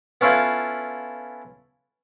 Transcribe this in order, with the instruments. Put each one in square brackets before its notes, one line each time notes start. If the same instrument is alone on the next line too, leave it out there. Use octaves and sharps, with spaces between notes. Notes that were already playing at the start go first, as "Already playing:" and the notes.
[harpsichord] B3 C#4 E4 F4 A4 B4